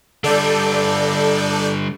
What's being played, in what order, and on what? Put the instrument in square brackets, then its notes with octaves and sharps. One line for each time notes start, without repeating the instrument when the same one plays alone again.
[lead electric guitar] D3 G3 [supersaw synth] A4 D5 G6